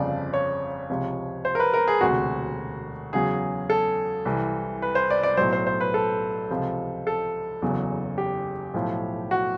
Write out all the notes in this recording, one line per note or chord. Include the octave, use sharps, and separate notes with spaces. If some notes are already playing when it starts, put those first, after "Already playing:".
Already playing: G1 F2 C#3 F3 D5
C#5
C#2 C3 F3
C5
A#4
B4
A#4
G#4
E1 D2 C3 F#4
E2 C#3 F#3 G#4
A4
C2 C3 E3
B4
C5
D5
D5
B1 A2 F#3 C5
C5
C5
B4
A4
C#2 C3 F3
A4
F#1 E2 C#3 F#3
G4
B1 A2 F3
F#4